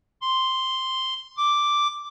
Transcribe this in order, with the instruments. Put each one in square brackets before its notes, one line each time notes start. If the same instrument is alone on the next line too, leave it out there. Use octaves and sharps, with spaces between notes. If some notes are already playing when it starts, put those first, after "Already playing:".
[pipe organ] C6
D6